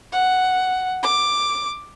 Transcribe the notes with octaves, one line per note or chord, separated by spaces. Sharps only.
F#5
D6